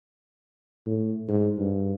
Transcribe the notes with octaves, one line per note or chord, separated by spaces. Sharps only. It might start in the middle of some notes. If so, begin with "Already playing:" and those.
A2
G#2
G2